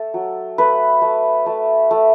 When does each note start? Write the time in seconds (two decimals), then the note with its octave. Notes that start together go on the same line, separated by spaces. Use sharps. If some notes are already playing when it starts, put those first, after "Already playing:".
Already playing: A3 A4
0.14 F#3
0.58 A3 B4
1.02 A3
1.46 A3
1.91 A3